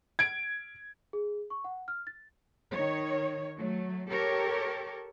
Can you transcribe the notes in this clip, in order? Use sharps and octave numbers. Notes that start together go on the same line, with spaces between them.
G#6 D7
G#4
C#6
F#5
F6
A6
D#3 C#5
F#3 A3
G4 A4 A#4 C#5